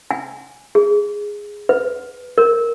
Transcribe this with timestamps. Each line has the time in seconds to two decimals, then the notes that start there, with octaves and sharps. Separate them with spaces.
0.11 G#5
0.75 G#4
1.69 B4
2.38 A#4